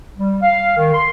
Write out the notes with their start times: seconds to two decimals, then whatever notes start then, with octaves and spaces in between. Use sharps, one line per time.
0.17 G3
0.42 F5
0.77 D#3
0.93 C6